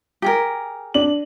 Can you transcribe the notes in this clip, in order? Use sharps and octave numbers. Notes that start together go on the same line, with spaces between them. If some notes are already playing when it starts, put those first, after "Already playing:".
G4 G#4 A#4
D4 F#7